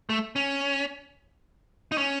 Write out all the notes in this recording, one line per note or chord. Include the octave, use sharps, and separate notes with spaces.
A3
C#4
D#4
C#4